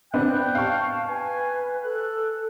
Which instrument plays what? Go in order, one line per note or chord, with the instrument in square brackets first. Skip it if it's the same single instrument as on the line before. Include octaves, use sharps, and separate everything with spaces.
[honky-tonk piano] B3 C4 D4 [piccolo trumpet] G5 [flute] F#6
[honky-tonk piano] F5 C#6 [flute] A5
[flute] B4 [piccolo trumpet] G#5
[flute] A4 [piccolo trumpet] F#6